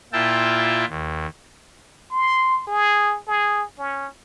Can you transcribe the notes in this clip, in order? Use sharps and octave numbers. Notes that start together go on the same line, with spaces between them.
A#2 E4 F4 E5 G5 A5
D#2
C6
G#4
G#4
C#4